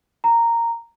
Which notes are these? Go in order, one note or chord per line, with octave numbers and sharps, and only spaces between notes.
A#5